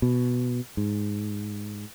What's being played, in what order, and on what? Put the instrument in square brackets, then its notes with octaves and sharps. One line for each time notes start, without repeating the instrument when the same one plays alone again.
[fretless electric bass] B2
G#2